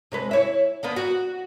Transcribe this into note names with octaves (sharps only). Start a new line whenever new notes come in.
C3 G#3 B4
E4 C#5 E5
D3 A#3 B3
F#4